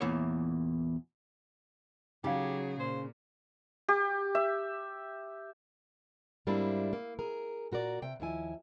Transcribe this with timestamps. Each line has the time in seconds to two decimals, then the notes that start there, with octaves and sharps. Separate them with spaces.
0.01 E2 A#2 E3 C#5
2.24 C#3 F#3 D#4 G4 G#4 F5
2.80 A#2 C5
3.88 G4
4.35 E5
6.47 G#2 G3 A#3 C4 D4 E4
6.93 A#3
7.19 G#4 A#4
7.72 A#2 F#4 A#4 D5
8.02 C3 G5
8.20 D#2 F3 E4 G#5